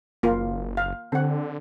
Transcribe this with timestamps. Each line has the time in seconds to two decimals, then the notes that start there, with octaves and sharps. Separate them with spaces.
0.23 F#1 A#3 F4 A#4
0.77 F5
1.12 D3 C4 F#5